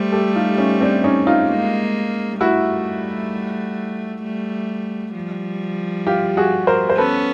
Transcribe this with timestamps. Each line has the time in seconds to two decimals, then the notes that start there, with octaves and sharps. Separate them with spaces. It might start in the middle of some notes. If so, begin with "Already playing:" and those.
Already playing: G3 A3 C5
0.12 G4 A4
0.35 D#4 F4
0.58 C#4 D#4
0.81 C4 D4
1.04 C#4 D#4
1.27 D#4 F4
1.49 G#3 A#3
2.41 G3 A3 E4 F#4
4.23 G3 A3
5.15 F3 G3
6.07 F4 G4
6.37 F#4 G#4
6.67 A#4 C5
6.90 C5
6.98 B3 C#4 A4 B4